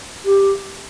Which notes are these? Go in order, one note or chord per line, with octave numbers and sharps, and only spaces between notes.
G4